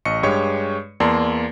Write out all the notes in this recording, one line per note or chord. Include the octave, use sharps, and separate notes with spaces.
A1 D#5 C#6 C#7
G2 G#3 G4 C#5 C#6
E2 A#3 D5 A5 C6